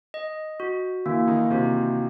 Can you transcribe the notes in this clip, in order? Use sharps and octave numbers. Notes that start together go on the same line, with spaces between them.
D#5
F#4
E3 A#3 E4
D#3 D#4
C3 C4 F#4